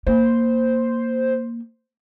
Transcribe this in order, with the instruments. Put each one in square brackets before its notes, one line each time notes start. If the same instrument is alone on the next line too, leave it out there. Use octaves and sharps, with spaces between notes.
[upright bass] A#3 [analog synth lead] C5